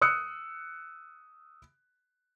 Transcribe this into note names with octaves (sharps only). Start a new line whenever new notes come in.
D#6 E6 F#6 C#7